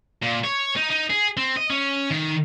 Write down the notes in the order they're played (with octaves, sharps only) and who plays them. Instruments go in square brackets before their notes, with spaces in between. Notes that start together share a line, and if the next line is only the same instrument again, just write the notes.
[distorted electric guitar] A#2
C#5
D#4
D#4
G#4
C4
D#5
C#4
D#3